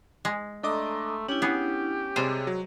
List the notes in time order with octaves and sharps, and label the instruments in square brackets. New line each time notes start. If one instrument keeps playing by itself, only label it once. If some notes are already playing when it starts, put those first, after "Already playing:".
[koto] G#3
[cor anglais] A3 [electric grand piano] D4 D#5 D6 [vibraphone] A4 A#5 C6
[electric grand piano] C#4 [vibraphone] D4 E4 [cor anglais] G4
[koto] B3 G#4
[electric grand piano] C3 D#7 [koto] G3 G#3 C5 [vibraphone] G#4 C#5
[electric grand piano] F#3